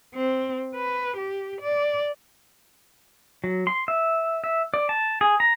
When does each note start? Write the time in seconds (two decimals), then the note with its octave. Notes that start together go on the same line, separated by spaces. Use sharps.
0.15 C4
0.76 B4
1.17 G4
1.61 D5
3.44 F#3
3.67 C6
3.88 E5
4.44 E5
4.74 D5
4.89 A5
5.21 G#4
5.40 A#5